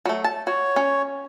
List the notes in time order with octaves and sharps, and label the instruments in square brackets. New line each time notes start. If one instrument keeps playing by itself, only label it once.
[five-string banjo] F#3 A3
A5
[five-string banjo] F#4 [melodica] C#5
[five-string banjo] C#4